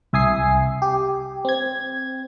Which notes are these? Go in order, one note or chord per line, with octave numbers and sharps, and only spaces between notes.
C2 E5 G#5 D#6 C7
G4
C4 G#6